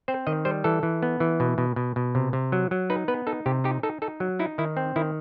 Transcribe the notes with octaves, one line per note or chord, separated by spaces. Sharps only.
C4 C5
D#3 D#5
G3 C5
E3 A4
E3
B3
E3
B2
B2
B2
B2
C3
C3
F#3
F#3
D#4 B4
B3 B4
D#4 A4
C3 G4
D#4 G4
D#4 A4
D#4 A4
F#3
D#4 E4
D#3 E4
C4
D#3 E4